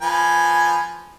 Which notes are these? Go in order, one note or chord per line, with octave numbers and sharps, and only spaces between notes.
F3 B4 G#5